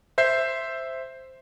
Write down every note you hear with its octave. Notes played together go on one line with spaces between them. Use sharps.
C5 E5 G6 C7